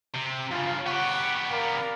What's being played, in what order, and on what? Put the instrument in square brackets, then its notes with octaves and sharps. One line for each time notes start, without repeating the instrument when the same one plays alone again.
[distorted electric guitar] C3
[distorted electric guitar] G2 C#3 [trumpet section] F4
[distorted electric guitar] B3 G4 [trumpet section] F#5 C#6
[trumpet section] A#4 D5 F5